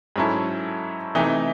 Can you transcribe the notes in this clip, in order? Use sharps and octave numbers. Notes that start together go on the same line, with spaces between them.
G#2 F#3 C#4 E4 A4
C3 E3 A3 D#4